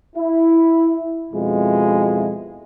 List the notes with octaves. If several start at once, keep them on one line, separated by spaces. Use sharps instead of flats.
E4
F2 B2 G#3 E4 F4